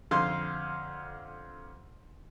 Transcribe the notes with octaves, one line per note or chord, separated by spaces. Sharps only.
F2 D3 F5 C6 F6